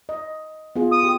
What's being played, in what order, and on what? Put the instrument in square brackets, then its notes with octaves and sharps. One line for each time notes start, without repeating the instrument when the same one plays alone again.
[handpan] D#5
B3 F4 G#4
[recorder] D#6
[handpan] G4